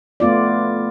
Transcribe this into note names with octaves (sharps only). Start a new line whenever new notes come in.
A3 B3 F4 D5